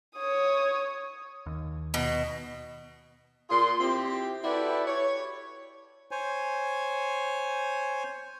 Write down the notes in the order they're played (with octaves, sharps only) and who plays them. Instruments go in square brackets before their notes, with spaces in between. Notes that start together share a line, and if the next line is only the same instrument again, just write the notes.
[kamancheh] C#5 D#6
[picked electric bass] D#2
[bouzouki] B2
[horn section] A#2 F4 G#4 C6
C4 E4 G4
E4 F#4 G4 A4 B4 D5
C#5
[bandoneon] C5 C#5 G#5